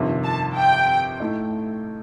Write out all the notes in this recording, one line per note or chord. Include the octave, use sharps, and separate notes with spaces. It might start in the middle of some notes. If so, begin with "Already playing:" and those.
Already playing: G1 F2 C3 D#3
A5
G5
A2 A3 D#4